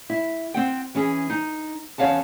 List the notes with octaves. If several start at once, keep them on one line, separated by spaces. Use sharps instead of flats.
E4
C4 F#5 G5
E3 C#4 G#4
D#4
E2 C#4 C#5 F5 F#5 A5